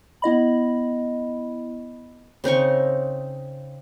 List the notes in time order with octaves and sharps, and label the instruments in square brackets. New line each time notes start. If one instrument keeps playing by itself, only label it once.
[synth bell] B3 E4 D#5 B5
[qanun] C#3 C4 D#4 C#6